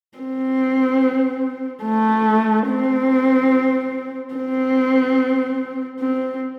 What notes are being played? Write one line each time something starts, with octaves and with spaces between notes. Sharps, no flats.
C4
A3
C4
C4
C4